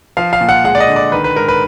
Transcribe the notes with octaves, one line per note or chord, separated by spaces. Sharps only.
F3 F5
F5
A#2
F#5
G#3 F#5
D5
D#5
D3
D5
D#3 B4
B4
G#2 A#4
B4